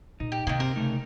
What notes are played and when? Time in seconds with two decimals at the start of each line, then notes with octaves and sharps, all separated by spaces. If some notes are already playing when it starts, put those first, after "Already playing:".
0.20 A#2 D#4
0.32 G4
0.47 C3 D#3 A#3
0.60 C4 G4 A#4
0.76 C#3 A3 D#4